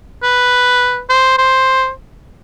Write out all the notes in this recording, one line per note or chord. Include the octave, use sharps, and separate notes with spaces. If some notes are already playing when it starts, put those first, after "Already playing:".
B4
C5
C5